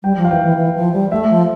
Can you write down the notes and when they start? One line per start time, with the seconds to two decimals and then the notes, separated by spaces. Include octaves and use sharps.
0.03 G3 G5
0.17 F3
0.25 F5
0.30 E3 G5
0.44 E3
0.57 E3
0.76 F3
0.93 G3
1.12 A3 E5
1.29 F3